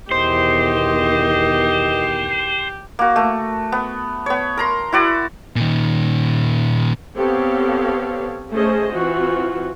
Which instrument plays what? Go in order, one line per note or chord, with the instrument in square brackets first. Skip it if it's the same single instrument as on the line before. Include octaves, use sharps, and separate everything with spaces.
[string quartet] E2 B2 D#3 [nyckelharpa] G4 [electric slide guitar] C5 [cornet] D#5
[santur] A#3 F#4
A3
B3
B3 C#5
A#4 A#5 C6
E4 F#4 D5
[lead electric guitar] A#2 D#3
[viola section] B3 C4 G4 A4 C#5 F5
A3 C#4 G#4 C5 D#5
E3 C4 F4 F#4